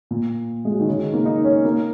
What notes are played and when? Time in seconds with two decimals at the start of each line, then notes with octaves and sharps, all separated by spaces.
0.11 A#2
0.65 G#3
0.72 F#3
0.80 D#3
0.88 C#3
1.00 D#3
1.14 A#3
1.26 D#4
1.44 C#4
1.65 A#3